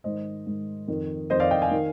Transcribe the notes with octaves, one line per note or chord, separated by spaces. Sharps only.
G#2 D#3 C5 D#5
G#2 D#3
F2 D#3
F2 D#3 C5 D#5
D5 F5
D#5 G5
F5 G#5
D#3